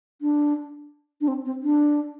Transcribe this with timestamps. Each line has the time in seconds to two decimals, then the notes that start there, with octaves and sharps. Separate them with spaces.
0.22 D4
1.21 D4
1.28 C4
1.45 C4
1.63 D4